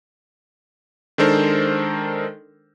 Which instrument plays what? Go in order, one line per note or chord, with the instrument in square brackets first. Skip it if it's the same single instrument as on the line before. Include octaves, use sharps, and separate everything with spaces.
[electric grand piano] D#3 G#3 D4 A4 A#4 C5